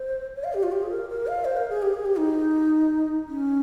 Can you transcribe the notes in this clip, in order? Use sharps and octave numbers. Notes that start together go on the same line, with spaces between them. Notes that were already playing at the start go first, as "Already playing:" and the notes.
Already playing: C5
C#5
F5
G4
F4
G4
G#4
A#4
A#4
F5
C5
A#4
G#4
G4
G#4
G4
D#4
C#4